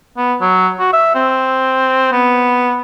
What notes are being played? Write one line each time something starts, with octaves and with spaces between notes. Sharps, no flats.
B3
F#3
F#4
E5
C4
B3